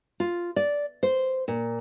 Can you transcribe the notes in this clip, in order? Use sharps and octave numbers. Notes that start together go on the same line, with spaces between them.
F4
D5
C5
A#2